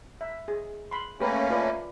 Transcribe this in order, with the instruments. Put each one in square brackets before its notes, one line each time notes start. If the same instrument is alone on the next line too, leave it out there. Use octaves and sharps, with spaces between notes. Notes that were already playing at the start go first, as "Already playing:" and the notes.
[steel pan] E5
G#4
B5 C6
[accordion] A3 A#3 C#4 [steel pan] G4 B4 A#5
[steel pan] F4 B4 D5